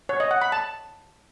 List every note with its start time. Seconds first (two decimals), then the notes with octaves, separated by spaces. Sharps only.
0.09 C#5
0.20 D#5
0.31 F#5
0.42 B5
0.52 A5